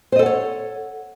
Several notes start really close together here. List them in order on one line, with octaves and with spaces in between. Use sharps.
C5 D#5 A4 F#5 C#5